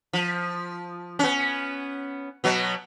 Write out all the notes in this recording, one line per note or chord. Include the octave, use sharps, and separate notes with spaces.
F3
B3 C#4
B2 F#3 B3